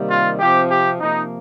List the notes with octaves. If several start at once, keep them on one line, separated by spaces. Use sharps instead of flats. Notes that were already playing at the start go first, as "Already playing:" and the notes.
Already playing: C3 D#3 G3 A#3
F4
C3 F3 C4 G4
G4
C3 F3 A#3 D#4